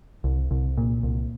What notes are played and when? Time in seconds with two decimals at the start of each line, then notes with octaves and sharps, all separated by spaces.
0.24 C2
0.51 C2
0.77 A#2
1.03 C2